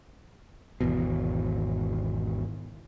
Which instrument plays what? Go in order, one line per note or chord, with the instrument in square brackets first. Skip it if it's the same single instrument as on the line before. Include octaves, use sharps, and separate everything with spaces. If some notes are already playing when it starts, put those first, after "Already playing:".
[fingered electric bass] G#1 E2 B2